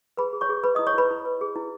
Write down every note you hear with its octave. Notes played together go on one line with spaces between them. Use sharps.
G#4 B4 B5
G#4
C#5 C#6
G#4
B4 B5
E4 D#5 D#6
C#5 C#6
E4 B4 B5
E4
B4
G#4
E4